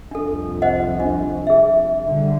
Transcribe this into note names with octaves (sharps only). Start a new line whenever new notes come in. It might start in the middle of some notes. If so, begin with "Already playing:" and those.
C2 F2 D4 A4
C5 D#5 F#5
D4
G#4 E5
D3 G3